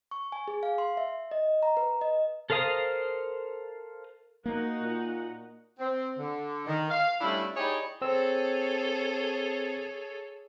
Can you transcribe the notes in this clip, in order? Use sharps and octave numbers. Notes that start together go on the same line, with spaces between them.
C#6
G#5
G#4
F5
C6
E5
D#5
A#5
B4
D#5
A4 A#4 C5 F5 D#6
A#3 D#4 F#4 A#4 F#5
A#2
C4
D3
D#3
F5
G3 A3 C#4 D4 E4
D#4 E4 G4 G#4 C#5 D5
C4 G#4 A4 C#5 E6